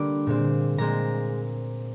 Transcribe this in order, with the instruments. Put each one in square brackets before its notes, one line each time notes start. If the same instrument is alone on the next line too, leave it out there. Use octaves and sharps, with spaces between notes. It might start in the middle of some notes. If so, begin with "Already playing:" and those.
Already playing: [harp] D3 G3 A#3 D6
A#2 G#3 C4
A#2 G#3 C4 A#5